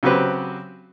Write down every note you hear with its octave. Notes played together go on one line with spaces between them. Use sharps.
C#3 F#3 C4 G4 B4 C5